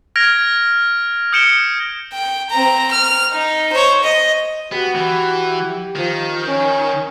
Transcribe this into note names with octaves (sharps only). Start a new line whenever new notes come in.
F6 G#6 A#6 D7 F7
D#6 G6 C#7 D7 E7 G7
G5
C4 A#5
F6
D#4
C5 C#5
D#5
B3 F#4 G4
E3
D#3 F3
C#4